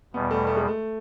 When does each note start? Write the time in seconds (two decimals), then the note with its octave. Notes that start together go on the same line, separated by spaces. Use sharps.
0.14 E2 B2 G3 B3
0.31 A3
0.47 A3
0.57 G#3
0.68 A3